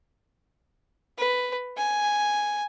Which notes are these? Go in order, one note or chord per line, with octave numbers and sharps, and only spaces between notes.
B4
G#5